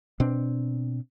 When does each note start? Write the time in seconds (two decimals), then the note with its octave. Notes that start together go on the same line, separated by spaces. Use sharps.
0.20 B2 C4 D4